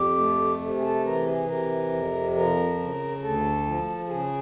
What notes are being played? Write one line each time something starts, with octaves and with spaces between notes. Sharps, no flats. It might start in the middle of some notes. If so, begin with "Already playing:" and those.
Already playing: F2 G4
A3
C3
G#4
A4
E3 A#4
G#4
C3 A#4
F2
F3 A#4
C#3
D2 A4
F3
C#3 G#4